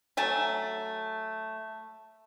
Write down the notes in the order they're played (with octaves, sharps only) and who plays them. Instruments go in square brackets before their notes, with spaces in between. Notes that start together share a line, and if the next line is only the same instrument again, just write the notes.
[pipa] F#3 A3 G#5 A5